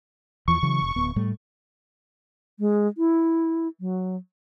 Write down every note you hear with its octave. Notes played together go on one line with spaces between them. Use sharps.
E2 E3 F3 C#6
C#3 E3 F#3
F1
D1 B3
A2 G3 A3
G#3
E4
F#3